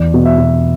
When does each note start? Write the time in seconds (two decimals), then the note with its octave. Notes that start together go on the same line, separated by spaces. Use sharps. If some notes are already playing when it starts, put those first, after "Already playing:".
Already playing: E2 D5
0.14 B2
0.25 E5
0.38 B2